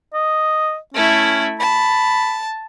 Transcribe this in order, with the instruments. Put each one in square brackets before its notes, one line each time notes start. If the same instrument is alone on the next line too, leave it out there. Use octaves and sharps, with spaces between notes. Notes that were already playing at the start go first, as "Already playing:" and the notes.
[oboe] D#5
[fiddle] A3 E4 [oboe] C#4
[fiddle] A5 [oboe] B5